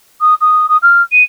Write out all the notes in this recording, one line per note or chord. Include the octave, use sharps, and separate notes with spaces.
D#6
D#6
D#6
F6
D#7